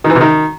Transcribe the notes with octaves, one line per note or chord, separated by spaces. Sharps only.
D#3
E3
C3
D#3